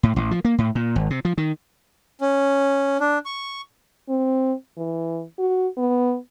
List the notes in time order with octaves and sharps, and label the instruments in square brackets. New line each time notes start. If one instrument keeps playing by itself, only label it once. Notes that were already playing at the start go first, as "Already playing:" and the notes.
[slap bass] A2
A1
F3
A#3
A2
A#2
G#1
C3
F3
D#3
[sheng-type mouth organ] C#4
D4
C#6
[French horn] C4
E3
F#4
B3